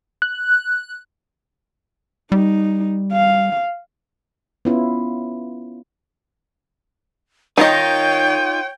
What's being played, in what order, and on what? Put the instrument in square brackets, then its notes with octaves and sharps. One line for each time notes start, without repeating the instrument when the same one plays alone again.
[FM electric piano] F#6
[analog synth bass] G3 [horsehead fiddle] D#4
[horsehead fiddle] F5
[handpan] B3 C#4 E4 F4
[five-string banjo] D#3 D#5 [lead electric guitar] D#4 F4 [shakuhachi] C#5 [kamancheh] G5